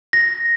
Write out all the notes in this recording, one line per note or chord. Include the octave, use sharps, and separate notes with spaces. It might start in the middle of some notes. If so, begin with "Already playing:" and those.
A#6